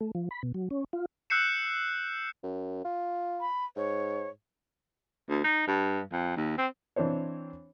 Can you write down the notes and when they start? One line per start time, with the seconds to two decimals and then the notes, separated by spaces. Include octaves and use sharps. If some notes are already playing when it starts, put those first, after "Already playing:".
0.01 A3
0.15 F3
0.31 B5
0.43 B2
0.54 F#3
0.71 C#4
0.93 F4
1.30 E6 F#6 G6 C7 C#7 E7
2.43 F#2
2.85 F4
3.40 B5
3.76 G#2 C#5
5.29 D2
5.44 D#4
5.67 G2
6.12 F2
6.37 D#2
6.58 C4
6.96 E3 C4 D4 C5 C#5